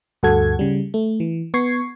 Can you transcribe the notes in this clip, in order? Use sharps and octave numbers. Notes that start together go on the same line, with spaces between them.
D2 G2 F#4 A4 F#5 G#6
C#3 G3
A3
E3
B3 C#6 G#6 C7